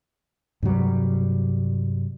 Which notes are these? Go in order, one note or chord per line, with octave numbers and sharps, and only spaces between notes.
G2 C3 F#3 G3